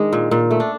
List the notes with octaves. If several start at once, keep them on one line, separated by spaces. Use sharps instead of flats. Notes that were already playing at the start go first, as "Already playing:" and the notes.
Already playing: D#3 G#3 D4
A#2
A#2
A3
D4